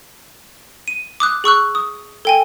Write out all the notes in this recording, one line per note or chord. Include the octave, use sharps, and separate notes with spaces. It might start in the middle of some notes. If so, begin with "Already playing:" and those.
D#7
D6 D#6 F#6
G#4 C#6 E6 F#6
D#6
A4 G5 G#5